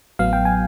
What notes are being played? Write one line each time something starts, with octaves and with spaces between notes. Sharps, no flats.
A1 A2 F#3 B3 F5
G5
G#5